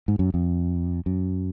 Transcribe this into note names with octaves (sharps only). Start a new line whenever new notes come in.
G#2
F#2
F2
F#2